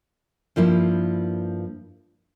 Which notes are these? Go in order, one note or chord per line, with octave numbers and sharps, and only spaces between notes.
G2 F3 A#3 E4